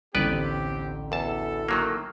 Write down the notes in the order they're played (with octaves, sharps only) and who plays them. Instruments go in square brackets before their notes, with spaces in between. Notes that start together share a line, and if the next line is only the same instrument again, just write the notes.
[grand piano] A1 D2 [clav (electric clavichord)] B3 B4 D5 [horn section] C4 G4
[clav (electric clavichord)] E2 A5 [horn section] E4 F#4 A4
[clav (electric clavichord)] D#3 F#3 A#3